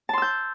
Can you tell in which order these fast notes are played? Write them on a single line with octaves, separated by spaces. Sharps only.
A5 C6 E6 G6